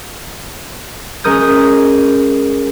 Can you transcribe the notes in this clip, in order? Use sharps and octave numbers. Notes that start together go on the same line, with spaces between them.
G#3 C#4 A#4 D#6 G6